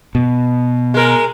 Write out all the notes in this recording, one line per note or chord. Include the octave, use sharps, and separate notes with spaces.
B2
G#3 A#4